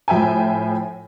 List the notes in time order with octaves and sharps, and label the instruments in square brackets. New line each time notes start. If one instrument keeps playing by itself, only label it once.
[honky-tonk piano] A2 F3 E5 G5 G#5